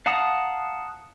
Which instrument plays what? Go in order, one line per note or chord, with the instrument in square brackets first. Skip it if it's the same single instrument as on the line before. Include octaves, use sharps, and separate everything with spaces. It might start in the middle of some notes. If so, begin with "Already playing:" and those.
[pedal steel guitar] F5 F#5 A5 A#5 D#6